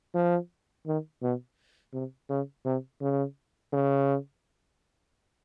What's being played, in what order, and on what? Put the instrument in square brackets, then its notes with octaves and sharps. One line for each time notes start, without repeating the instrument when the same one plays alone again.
[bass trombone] F3
D#3
B2
C3
C#3
C3
C#3
C#3